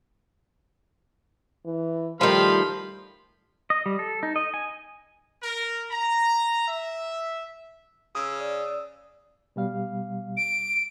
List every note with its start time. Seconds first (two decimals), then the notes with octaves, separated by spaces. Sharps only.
1.65 E3
2.21 D#3 F3 G3 A3 F5 B5 C6
3.70 D#5
3.86 G3
3.99 A4
4.23 D#4
4.36 D#5
4.54 G#5
5.43 A#4
5.91 A#5
6.68 E5
8.15 C#3 D#6 E6
8.39 D5
9.56 B2 G3 F5
10.37 D7